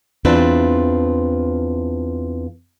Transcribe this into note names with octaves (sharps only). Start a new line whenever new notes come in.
E2 C4 D4 F4 B4